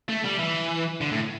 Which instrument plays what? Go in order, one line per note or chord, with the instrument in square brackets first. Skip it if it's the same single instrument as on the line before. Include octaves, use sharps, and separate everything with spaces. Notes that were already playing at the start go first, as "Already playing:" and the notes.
[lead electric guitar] A3
G3
E3
D3
A2